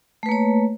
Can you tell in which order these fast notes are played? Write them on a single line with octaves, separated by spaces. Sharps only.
A3 B4 A#3 C#5